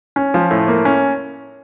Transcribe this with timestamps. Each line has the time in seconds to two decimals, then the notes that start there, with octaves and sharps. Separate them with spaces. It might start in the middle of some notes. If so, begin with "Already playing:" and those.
0.16 C#4
0.34 F3
0.51 A2
0.68 A#3
0.85 C#4